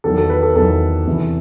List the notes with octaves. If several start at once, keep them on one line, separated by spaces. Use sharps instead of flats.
E2 D#3 F#3 A4
A4
B4
A4
E2 D#3 F#3 A4
E2 C3 E3